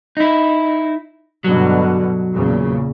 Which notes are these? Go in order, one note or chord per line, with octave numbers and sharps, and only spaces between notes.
D#4 E4
G2 B2 D3 F#3
E2 A#2 C#3